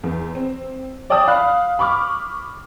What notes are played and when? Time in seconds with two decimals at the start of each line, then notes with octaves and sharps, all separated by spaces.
0.04 E2
0.35 C4
1.10 C#5 D5 G5 A5 D#6
1.27 F5 B5 F#6
1.79 B5 C#6 D6 F6